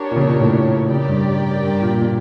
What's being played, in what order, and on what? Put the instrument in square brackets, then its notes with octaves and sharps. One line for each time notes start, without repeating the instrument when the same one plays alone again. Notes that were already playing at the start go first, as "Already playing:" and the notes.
Already playing: [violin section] D4 G4 A#4 C#5
[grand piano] A#2
C#3
A#2
A2
A#2
[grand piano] C#3 [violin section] G4 A#4 D5 G5
[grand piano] G2
G2
A#2
A#2